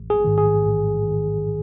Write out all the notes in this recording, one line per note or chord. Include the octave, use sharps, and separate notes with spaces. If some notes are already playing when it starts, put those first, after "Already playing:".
Already playing: A1
G#4
G#2 D#3
G#4
A1
D#3